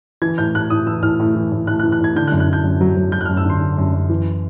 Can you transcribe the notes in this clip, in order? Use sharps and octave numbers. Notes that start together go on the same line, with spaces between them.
E3 G#6
A2 G6
A2 F#6
A2 D#6
E3 E6
A2 F6
A2
E3
A2
A2 F#6
F#6
E3
F#6
A2 G#6
D3 G6
F#6
F#2
F#6
D3 G6
F#2
F#3
F#3
F#3 G6
F#6
F#2 F6
E6
D3 C6
D3
F#2
F#2
E3